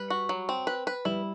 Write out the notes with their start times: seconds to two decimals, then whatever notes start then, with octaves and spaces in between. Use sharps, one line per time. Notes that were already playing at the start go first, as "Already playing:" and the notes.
Already playing: G3 B4
0.10 F#4
0.29 F#3
0.49 C4
0.67 B4
0.87 B4
1.05 G3 E4